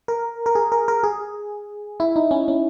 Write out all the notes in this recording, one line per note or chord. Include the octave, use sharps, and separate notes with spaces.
A#4
A#4
G#4
A#4
A#4
G#4
E4
D#4
C#4
C#4